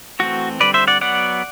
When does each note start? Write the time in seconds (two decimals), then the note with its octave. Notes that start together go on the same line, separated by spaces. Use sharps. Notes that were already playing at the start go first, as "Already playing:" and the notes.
0.19 E3 A3 C4 F#4
0.60 D3 G3 C4 B4 D5
0.74 C5 E5
0.88 D5 F#5
1.01 F#3 B3 D5 F#5